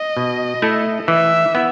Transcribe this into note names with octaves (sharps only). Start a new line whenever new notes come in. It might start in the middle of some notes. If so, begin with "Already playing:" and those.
Already playing: D#5
B2
A3 E4 A4
E3 E5
B3 E4